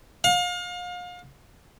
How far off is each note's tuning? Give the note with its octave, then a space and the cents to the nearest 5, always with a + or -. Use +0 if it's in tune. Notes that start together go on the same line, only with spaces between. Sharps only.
F5 +35